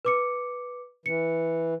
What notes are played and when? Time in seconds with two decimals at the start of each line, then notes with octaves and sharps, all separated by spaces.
0.05 B4 D6 C#7
1.06 E3 C#7